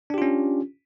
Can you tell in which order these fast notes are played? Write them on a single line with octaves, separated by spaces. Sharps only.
D4 G4 F4 C#4